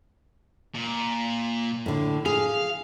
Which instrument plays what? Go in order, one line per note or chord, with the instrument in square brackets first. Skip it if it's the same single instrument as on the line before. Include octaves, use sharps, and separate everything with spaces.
[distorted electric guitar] A#2
[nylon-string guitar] A2 D3
[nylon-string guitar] G#4 [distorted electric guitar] F5